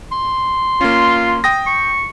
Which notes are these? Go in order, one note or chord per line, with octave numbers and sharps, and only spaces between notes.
C6
A#3 C#4 F4
G5 D#6 A#6
C#6